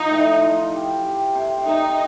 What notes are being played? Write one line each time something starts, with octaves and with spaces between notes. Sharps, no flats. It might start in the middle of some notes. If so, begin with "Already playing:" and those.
Already playing: F3 D#4
A2
F4
G4
G4
C3
C3 D#4